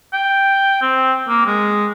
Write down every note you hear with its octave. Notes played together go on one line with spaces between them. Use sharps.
G5
C4
A#3
G#3